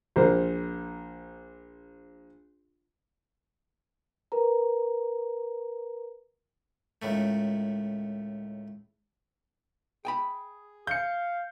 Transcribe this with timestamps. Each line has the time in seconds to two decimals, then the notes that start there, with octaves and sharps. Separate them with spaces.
0.16 A#1 A#4 C5
4.32 A#4 B4 A#5
7.02 C#2 A2 D#3 A3
10.05 G#4 G5 G#5 B5
10.87 F5 G6 C#7